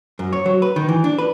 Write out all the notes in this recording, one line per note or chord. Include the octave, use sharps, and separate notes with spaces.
F#2
C#5
F#3
B4
D#3
E3
D4
B4